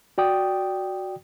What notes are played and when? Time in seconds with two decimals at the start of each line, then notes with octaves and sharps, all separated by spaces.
0.18 F#4 D5 G5 D#6